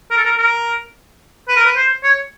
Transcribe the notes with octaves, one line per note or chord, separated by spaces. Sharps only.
A#4
A4
A#4
A#4
B4
A#4
B4
C5
C#5